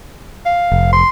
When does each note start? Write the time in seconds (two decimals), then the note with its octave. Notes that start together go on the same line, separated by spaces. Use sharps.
0.45 F5
0.72 F1
0.92 C6